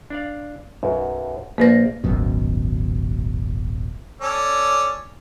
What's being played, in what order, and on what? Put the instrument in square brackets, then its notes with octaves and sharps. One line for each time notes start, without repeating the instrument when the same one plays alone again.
[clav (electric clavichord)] D4 D5 F5
B1 F#2
[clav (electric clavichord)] A#1 F4 D5 [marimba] A#3 B4 A#6
[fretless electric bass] D#1 G#1 F#2 B2
[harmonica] C#4 A4 D5